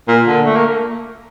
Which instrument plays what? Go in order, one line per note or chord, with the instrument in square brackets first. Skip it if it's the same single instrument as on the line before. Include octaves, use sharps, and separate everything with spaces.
[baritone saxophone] A#2
D3
A3
A#3